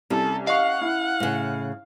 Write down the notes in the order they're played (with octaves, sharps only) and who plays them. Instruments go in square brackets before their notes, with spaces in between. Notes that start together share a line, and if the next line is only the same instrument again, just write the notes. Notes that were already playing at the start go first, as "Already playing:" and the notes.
[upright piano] C2 [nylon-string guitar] C#4 [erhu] A4
[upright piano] D#5 C#6 [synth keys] F5 [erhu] F#5
[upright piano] E4
[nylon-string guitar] A2 C#3